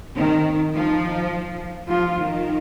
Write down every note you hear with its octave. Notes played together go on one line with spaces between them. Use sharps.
D#3 C4
F3 D#4
F3 F4
D#3